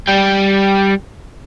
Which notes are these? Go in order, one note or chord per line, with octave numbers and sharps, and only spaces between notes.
G3 G5